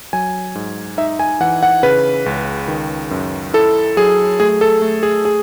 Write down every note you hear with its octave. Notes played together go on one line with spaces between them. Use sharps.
F#3 G#5
G#2
D#4 E5
G#5
E3 F#5
F#5
C#3 B4
C#2
D#3
F#2
E4 A4
F#3 G#4
A3 G#4
A4
A3
G#4
G#4